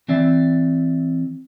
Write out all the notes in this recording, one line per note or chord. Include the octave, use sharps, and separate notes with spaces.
E3 C4 D5 E5